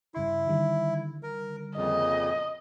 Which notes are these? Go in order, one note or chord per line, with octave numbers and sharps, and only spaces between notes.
G2 C#3 E4 C6
D3 D#3 G3
A#4
F2 A#2 C#3 D#5